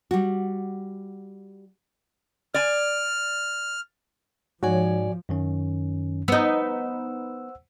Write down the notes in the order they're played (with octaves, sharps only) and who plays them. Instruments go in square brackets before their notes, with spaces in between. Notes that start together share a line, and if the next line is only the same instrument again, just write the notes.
[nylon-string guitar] G3 F#4
[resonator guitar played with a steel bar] D5 G#5 [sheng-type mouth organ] F6
[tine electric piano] G#2 [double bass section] F3 [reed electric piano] F#4 G#5 [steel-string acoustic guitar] C#5 D5
[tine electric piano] F#2 D#3 C#4
[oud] B3 D#4 [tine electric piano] C5 F#5 E6